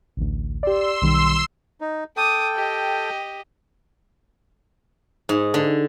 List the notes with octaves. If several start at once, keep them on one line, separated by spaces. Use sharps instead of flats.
A1 D2
G4 D5 C6 E6
B1 D#3 G3
D#4
A4 G5 D6 D#6
G4 D#5
G#2
D3